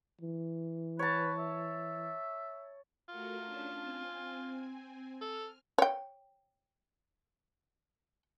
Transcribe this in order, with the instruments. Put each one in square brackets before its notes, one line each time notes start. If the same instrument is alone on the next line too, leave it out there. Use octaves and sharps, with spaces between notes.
[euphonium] E3
[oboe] B4 [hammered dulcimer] C#5 A5
[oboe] E5
[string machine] A3 F#4 A#4 [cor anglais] F4
[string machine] C#4 D4 A5
C4 G#5
[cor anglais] A4 [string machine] F6
[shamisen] C#5 G5